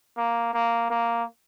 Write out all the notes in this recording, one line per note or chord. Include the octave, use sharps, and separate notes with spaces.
A#3
A#3
A#3